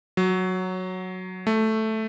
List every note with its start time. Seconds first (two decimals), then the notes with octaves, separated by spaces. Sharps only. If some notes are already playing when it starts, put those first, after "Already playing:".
0.17 F#3
1.47 A3